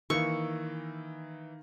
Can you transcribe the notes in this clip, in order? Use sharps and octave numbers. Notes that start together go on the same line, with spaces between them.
D#3 E3 A#3 C#6 E6